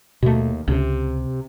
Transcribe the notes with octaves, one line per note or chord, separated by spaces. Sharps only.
D#2 B2 A3
C#2 C3